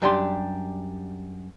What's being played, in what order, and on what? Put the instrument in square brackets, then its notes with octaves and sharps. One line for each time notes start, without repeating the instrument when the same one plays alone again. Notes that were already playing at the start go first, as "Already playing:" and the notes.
[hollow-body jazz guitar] F#2 G3 D4 G4 B5 C6